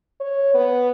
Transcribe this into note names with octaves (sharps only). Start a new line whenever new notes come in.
C#5
B3